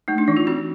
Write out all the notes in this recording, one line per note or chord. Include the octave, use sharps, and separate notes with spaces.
A3 D#4
D4
E3 D#4
F4
C4 F#4